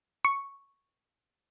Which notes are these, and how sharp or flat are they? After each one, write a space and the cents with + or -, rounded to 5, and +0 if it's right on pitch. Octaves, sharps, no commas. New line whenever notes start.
C#6 +0